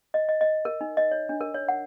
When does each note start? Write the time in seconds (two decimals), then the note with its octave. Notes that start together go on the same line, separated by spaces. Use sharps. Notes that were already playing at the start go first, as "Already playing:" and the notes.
0.14 D#5
0.29 D#5
0.41 D#5
0.65 A#4
0.81 D#4
0.97 D#5
1.12 C#5
1.29 D4
1.41 A#4
1.54 C#5
1.68 F#5